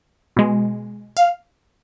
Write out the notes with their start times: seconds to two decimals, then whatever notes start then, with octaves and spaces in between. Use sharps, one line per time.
0.36 B2 G#3
1.17 F5